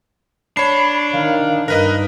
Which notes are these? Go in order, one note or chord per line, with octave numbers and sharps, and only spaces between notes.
D4 C#5 B5 C7
D#3 F5
G2 D#4 A#4 B4 D#5 F#6